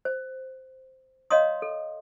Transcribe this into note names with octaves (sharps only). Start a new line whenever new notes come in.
C5
C#5 D#5 F5 A#5 C6 D#6
A4